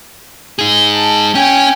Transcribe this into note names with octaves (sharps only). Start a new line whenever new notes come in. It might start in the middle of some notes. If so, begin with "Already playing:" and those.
D#4 G#4
A5
C#4 G5 G#5